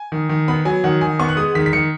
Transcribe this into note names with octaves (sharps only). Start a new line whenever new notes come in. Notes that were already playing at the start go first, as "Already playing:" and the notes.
Already playing: G#5
D#3
D#3
B3 B5
F#3 G#5
D#3 F#5
D#3 G#5
B3 C#6
F#6
G#3 D#6
D#3 B6
B6
D#3 C#7